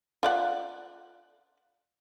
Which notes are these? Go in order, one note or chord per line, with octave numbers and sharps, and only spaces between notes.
F4 D5 F#5